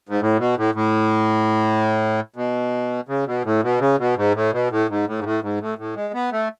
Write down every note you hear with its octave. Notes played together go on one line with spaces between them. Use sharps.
G#2
A2
B2
A2
A2
B2
C#3
B2
A2
B2
C#3
B2
G#2
A2
B2
A2
G#2
A2
G#2
A2
G#2
A2
A2
G#3
B3
A3